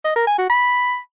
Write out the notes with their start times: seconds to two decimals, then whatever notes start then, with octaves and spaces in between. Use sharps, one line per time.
0.05 D#5
0.16 A#4
0.27 G#5
0.38 F#4
0.50 B5